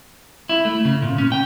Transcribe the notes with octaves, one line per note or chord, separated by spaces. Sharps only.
E4
A3
C#3
A#2
C#4
G5